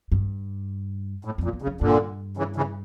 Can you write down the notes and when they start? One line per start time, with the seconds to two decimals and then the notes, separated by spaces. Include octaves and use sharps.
0.12 G2
1.25 A2
1.38 F2
1.44 A#2
1.53 E2
1.62 C#3
1.67 F2
1.81 G2 A#2 D3
2.37 C#3 E3
2.56 C#3 E3